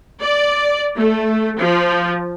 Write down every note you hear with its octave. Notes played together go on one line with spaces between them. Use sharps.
D5
A3
F3